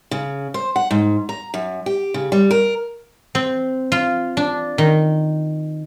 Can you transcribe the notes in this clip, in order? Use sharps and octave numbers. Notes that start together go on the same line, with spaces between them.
C#3
C5
F#5
G#2
A#5
F#2
G4
C#3
G3
A#4
C4
F4
D4
D#3